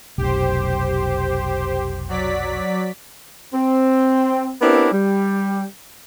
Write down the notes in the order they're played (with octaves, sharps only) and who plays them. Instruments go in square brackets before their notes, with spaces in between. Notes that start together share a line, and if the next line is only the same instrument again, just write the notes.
[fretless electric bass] F1 B1 [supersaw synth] G4 C5
[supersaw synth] F#3 D5 B6
[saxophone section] C4
B3 C4 D4 E4 G4 A#4
G3